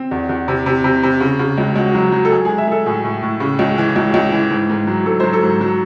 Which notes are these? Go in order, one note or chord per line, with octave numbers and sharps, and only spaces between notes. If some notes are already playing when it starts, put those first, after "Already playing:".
Already playing: C4
E2
E2
C3
C3
C3
C3
C#3
C#3
C#2
C#2 F#4
F#3
F#3
A4
G#3 G#4
G#3 G#4
E5
G#3 A4
A2 G#4
A2
A2
C#3
C#2
E3
C#2
C#2
E3
G#2
G#2
F#3
G#2 A4
F#3 C5
A4
G#2
F#3